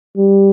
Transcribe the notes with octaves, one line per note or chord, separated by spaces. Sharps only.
G3